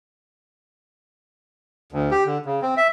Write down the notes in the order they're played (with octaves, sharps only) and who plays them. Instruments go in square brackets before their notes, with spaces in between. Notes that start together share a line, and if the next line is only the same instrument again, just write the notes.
[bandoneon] D2
G4
D3
C#3
C4
E5